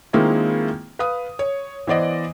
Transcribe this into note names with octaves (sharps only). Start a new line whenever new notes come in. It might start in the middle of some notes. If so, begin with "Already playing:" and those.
D#3 G#3 A#3 C4 E4 F4
B4 F5 D#6
C#5
E3 B3 C5 D5 D#5